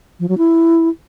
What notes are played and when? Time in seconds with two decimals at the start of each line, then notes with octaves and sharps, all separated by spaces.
0.20 F3
0.29 F#3
0.38 E4